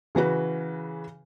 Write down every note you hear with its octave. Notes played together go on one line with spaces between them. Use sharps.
C#3 E3 F#4 B4